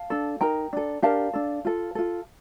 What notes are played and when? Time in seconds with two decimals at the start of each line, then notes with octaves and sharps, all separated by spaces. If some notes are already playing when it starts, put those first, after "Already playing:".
Already playing: F5 A5
0.10 D4 A4
0.41 D#4 A#4 G5 A#5
0.73 D4 A4
1.02 D4 G4 A#4 F5 A5
1.34 D4 A4
1.65 F4 A4
1.95 F4 A4